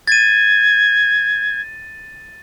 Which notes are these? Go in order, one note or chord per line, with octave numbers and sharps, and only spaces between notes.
G#6 A6 D#7